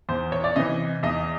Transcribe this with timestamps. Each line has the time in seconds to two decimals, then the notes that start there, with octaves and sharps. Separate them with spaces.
0.09 E2 C5
0.32 C#5
0.44 D5
0.56 C3 E3 D#5
1.03 E2 D#5